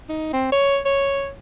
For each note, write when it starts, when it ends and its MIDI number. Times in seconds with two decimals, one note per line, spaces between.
0.09 0.32 63
0.33 0.49 60
0.52 0.79 73
0.85 1.30 73